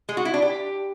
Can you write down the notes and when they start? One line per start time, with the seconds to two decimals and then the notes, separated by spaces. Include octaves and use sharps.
0.09 G#3
0.17 F#4
0.25 E4
0.34 D4
0.42 G4